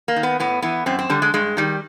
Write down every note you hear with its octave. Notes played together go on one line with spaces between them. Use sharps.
A#3
D#3
B3
A2 B3
E3 B3
F#2 C4
C4
D3 G3
G#3
G2 G#3
D#3 G3